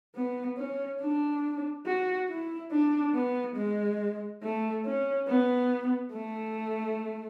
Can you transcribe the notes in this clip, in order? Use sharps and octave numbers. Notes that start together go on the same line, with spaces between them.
B3
C#4
D4
F#4
E4
D4
B3
G#3
A3
C#4
B3
A3